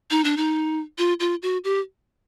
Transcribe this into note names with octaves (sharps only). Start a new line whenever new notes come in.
D#4
D4
D#4
F4
F4
F#4
G4